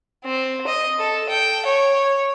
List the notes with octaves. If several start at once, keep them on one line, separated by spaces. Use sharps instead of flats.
C4
D#5
A4
G5
C#5